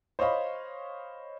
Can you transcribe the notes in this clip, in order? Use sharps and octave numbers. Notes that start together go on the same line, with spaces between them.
C5 C#5 D#5 F5 B5